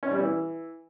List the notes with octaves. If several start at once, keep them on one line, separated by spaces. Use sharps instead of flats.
C#4
G3
E3